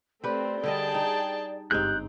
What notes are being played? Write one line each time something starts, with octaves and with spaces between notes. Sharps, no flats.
A3 C4 G4 B4 D5
D3 G3 G#4 D#5 G5 A5
D#4
G1 G#2 C4 D#4 G4 F#6 G6